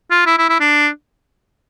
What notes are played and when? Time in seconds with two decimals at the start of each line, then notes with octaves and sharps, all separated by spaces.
0.11 F4
0.26 E4
0.38 E4
0.49 E4
0.60 D4